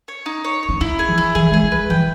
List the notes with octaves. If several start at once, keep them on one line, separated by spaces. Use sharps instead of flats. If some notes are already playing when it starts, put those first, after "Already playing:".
C#5
D#4
C#5
C#5
C#4
D#4 E4
G#4
E3
E4
E3 G#4
G#3 G#4
G3
B4
E3 G5